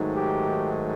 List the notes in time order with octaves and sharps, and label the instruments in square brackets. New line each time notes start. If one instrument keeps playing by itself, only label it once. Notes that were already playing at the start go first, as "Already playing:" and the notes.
Already playing: [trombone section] G#2 D#3 F#3 A3
G4